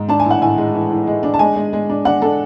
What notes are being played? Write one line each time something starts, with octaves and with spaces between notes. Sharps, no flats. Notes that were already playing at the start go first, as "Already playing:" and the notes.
Already playing: G#2
D4 A5
G#5
A2 F#5
A2 G#5
G#3
E3
E3
G#3
D4
A5
G#3 G#5
G#3
G#3
D4
D4 F#5
D4 A4